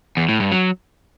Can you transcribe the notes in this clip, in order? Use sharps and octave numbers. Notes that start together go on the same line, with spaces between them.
E2
A2
G2
F#3